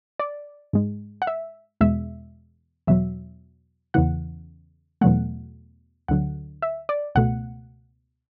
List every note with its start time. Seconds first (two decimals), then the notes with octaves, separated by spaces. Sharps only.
0.19 D5
0.73 G#2 G#3
1.22 F#5
1.27 E5
1.81 E2 B2 G#3 E5
2.87 E2 B2 F#3 E5
3.94 E2 C#3 E3 F#5
5.01 E2 B2 F#3 A3 F#5
6.08 D2 D3 F#3 F#5
6.62 E5
6.89 D5
7.15 C#2 B2 A3 F#5